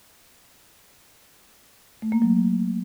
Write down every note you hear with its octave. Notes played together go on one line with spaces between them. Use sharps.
A3
A#3
F#3